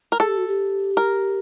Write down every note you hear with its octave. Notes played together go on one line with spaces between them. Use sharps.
A#4
G#4 A4
G4
F#4
G4
A#4